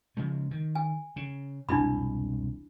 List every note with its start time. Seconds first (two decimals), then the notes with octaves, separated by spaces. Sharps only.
0.17 C#3 F3 G#3
0.51 D#3
0.75 G#5
1.16 C#3
1.69 E1 C2 F2 D4 E4 B5